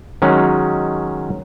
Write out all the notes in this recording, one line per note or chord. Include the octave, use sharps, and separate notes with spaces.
D#3 F#3 G#3 C#4